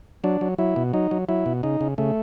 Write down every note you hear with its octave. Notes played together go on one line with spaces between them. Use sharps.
F#3 D4
F#3
F#3 E4
B2
F#3 D#4
F#3
F#3 E4
B2
C#3 D#4
C#3
C#3 A3